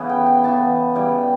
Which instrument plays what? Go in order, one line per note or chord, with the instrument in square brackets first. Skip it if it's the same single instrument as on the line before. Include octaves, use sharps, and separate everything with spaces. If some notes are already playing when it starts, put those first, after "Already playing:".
Already playing: [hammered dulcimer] C#3 E3 B3
G5
G5
C#3 E3 B3 A5
C#3 E3 G3 G5